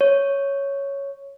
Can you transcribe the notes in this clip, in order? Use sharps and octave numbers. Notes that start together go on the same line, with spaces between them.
C#5